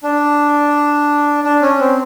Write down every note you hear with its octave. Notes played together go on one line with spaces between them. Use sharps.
D4
D4
C#4
C4